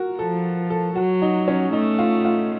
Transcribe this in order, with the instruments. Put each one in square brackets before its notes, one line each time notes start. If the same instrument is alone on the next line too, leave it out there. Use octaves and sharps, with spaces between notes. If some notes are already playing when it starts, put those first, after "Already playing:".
Already playing: [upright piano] F#4 A#4
[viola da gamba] F3 [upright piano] A4
[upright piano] A4
[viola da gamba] F#3 [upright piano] F#4
[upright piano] D#4
C#4
[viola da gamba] A3 [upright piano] D#4
[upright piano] F4
F4